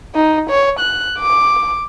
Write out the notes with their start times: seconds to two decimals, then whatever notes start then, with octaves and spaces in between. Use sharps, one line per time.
0.15 D#4
0.50 C#5
0.80 F#6
1.19 D6